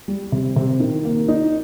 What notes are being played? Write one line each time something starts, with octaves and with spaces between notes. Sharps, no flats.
G3
C3
C3
D#3
A#3
D#4